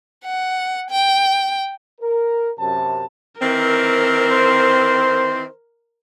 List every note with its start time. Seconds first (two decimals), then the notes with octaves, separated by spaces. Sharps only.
0.24 F#5
0.90 G5
2.01 A#4
2.58 F#2 C3 A5
3.41 D#3 E3 C4 A#4
4.30 C5